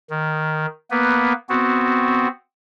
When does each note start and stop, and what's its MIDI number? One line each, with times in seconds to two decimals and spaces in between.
0.10 0.66 51
0.91 1.33 58
0.91 1.33 59
0.91 1.33 71
1.49 2.28 59
1.49 2.28 60
1.49 2.28 66